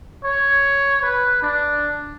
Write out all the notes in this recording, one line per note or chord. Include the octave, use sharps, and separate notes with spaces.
C#5
B4
D4